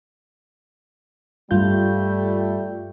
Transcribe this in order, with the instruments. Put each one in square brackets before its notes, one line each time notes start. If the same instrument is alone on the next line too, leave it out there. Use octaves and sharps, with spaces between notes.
[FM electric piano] G2 F4 G6 [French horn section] G3 A3